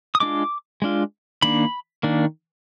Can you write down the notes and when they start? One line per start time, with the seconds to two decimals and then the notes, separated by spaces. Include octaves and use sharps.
0.15 D#6
0.20 G#3 D4 F4 D6
0.82 G#3 D4 F4
1.42 D#3 A#3 D4 B5
2.03 D#3 A#3 D4